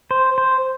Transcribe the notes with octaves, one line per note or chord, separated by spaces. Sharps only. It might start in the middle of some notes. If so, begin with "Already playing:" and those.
C5
C5